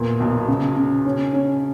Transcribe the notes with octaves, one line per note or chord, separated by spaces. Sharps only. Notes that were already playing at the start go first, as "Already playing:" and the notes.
Already playing: E2 A#2
B1
C#3
C#3
C#4
C#4